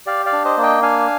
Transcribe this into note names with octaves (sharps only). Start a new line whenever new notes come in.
G4 D5 F5
D5 F5
D4
C5 D#5
A#3
D#5 G5
D4 F5 G#5